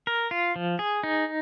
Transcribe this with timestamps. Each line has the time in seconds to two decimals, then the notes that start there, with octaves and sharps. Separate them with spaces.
0.07 A#4
0.31 F4
0.56 F3
0.79 G#4
1.03 D#4